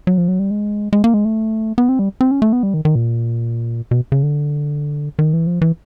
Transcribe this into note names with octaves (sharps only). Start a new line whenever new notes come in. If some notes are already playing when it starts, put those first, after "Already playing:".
F#3
F3
F#3
G3
G#3
G#3
A#3
G#3
A3
B3
C4
G3
C4
C#4
A3
B3
G3
D#3
D#3
A#2
B2
C#3
D3
D#3
E3
F3
E3